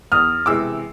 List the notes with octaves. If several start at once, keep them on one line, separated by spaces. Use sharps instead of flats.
E2 D#6 F6
C3 E3 G#3 D6 E6